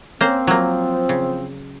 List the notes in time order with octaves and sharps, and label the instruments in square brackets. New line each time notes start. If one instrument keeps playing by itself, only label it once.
[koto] A#3 C5 [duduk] C4 [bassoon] C#4
[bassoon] F3 [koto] F#3 A#3
[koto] C#3